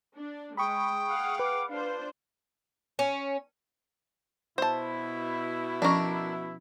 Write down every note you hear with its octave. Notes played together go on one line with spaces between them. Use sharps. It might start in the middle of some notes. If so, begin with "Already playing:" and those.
D4
G#3 G5 B5 C#6 D#6
G#4 F5 F#5
B4 D6
D4 F4 C5 F5
C#4
B2 E4 C5 A5
F3 C#4 D4 A#4 C#6